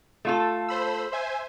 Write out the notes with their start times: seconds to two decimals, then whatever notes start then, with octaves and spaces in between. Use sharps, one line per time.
0.25 A3 F4 A4
0.68 C5 B5 E6
1.12 C5 E5 G#5